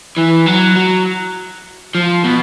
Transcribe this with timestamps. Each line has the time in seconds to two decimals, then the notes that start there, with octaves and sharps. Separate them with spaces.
0.17 E3
0.46 F#3
0.76 F#3
1.95 F3
2.24 B2